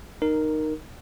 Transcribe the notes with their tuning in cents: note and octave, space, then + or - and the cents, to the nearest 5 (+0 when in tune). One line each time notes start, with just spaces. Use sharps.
D#4 -15 A#4 +0